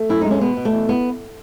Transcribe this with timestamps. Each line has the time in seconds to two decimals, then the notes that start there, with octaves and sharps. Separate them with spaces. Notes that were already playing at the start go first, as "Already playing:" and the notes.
Already playing: A3
0.09 F#2 E4
0.21 G#3 D#4
0.31 C#4
0.41 B2 B3
0.57 B2
0.65 A3
0.72 E2
0.89 B3